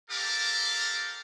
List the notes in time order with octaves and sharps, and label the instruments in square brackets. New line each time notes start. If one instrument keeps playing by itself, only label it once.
[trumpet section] C4 G4 A4 A#4 F5 D6